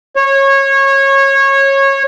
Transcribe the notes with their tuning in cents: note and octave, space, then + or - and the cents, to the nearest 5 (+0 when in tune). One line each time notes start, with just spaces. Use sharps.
C#5 -20